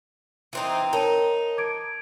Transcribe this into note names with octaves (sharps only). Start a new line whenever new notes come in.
E3 C4 D#4
D#4 A#4 C#5 A5
D6 G#6 D7